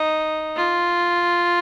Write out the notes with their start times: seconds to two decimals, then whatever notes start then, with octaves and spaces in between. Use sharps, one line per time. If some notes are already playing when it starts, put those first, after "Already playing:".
Already playing: D#4
0.56 F4